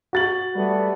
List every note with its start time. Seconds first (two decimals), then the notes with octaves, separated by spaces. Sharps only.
0.13 F#4 A6 F#7
0.55 G3 A3 B3